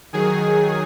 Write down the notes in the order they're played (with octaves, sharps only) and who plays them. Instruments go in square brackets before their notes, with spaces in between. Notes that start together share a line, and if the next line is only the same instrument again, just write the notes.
[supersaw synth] D#3 F#3 G#4